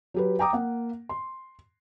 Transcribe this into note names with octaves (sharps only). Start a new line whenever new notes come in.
F#3 G4 B4
G5 A#5 D6 D#6
A#3 F#5
C6